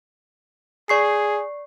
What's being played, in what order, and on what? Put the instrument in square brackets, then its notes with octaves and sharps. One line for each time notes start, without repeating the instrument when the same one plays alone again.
[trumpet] G#4 [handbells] D5 C#6 C7